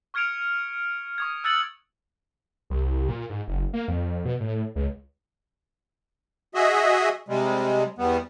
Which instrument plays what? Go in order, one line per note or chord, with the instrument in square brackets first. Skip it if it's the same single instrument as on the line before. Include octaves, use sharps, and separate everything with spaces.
[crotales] C#6 F6 G#6 C#7 D7 F7
C#6 D#6 G#6
E6 F#6 G#6 A6 C#7 F#7
[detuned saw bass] C2
A#2
G#2
F#1
A#3
F2
B2
A2
C#2
[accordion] F#4 G#4 D#5 E5
C3 G3 G#3
E2 G3 B3